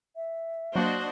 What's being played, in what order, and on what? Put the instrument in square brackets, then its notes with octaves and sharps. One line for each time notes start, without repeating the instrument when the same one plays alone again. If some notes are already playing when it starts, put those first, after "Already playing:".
[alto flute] E5
[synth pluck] F#3 A#3 [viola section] D4 C5 D#5 [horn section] F#4